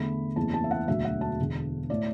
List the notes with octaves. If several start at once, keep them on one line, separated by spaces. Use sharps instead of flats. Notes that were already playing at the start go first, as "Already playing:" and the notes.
Already playing: E2 D3 A3 B5
F#1 E2 E3 A3 A5
A5
E5
F#5
E1 D2 D3 F#3 E5
F#5
A5
E1 E2 D3
A2 A3 D5